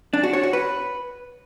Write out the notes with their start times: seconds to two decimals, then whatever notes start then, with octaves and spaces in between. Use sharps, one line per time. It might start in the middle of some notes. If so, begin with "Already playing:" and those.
0.13 D4
0.23 F#4
0.33 C#5
0.43 F#4
0.53 B4